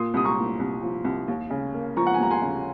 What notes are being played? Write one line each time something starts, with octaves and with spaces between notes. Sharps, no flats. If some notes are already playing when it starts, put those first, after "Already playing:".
Already playing: A#2 C6 D#6
C2 D#6
A#5 C#6
A#2
C2
F3
C2
D#2
C#3
A#3
F3 A#5 C#6
F#5
G#5
D#2 A#5
G#5 C6
C#3